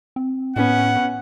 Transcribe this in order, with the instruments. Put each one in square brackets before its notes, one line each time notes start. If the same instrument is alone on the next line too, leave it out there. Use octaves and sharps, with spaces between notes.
[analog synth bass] C4
[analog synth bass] A2 [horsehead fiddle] B3 C#4 [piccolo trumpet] F#5